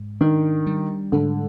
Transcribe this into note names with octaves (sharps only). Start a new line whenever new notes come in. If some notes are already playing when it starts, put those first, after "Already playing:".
Already playing: G#2
D#3 D4
G3
G#2 D3